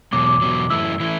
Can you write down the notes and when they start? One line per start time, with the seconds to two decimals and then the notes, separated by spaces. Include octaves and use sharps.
0.13 E2 B2 F#3 D6
0.27 D6
0.42 E2 B2 F#3
0.70 F#2 E3 A3 E4 E6
1.00 E3 A3 E4